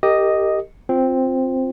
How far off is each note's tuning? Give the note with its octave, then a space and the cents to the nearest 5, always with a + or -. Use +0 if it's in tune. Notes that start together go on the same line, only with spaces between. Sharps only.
G4 +0 A#4 -35 D#5 +0
C4 +0 F4 +5 C5 +0